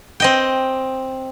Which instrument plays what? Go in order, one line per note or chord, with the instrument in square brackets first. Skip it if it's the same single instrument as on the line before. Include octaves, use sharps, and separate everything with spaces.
[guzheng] C4 D#5 G5